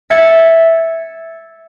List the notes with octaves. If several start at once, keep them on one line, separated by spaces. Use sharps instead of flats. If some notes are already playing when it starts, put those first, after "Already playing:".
E5 G#6 A6 C#7